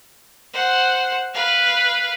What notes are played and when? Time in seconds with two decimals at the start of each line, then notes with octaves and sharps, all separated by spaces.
0.53 C5 F#5
1.34 B4 F5